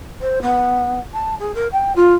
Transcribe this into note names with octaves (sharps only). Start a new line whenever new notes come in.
C5
B3
A5
G#4
A#4
G5
F4